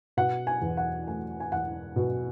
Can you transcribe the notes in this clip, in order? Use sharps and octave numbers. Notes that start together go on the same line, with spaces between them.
B2 F#5
G#5
E2
F#5
A3 G#5
G#5
E1 F#5
B2